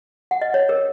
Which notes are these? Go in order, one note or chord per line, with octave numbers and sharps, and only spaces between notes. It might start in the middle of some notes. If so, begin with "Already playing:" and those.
F#5
D#5
C#5
A#4